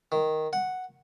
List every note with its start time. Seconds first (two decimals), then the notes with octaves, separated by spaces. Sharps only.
0.12 D#3
0.53 F#5